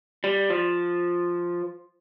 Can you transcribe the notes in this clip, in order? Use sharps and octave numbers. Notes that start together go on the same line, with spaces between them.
G3
F3